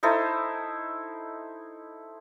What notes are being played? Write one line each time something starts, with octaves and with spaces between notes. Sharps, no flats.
D#4 E4 A4 C5